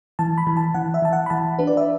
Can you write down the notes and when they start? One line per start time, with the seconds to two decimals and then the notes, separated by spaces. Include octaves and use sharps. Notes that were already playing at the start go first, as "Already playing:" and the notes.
0.19 E3 A5
0.38 B5
0.47 E3
0.57 A5
0.74 E3 F#5
0.94 E5
1.02 E3 A5
1.13 F#5
1.26 B5
1.30 E3 A5
1.59 D4 B4
1.67 D5
1.77 E5